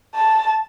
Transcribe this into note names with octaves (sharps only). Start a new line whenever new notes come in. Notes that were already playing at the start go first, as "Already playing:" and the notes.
A5